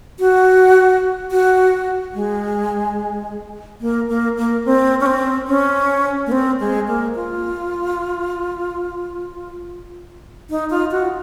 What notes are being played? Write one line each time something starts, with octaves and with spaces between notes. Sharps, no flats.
F#4
F#4
G#3
A#3
A#3
A#3
C4
C#4
C4
C#4
A#3
C4
G#3
A#3
F4
D#4
F4
F#4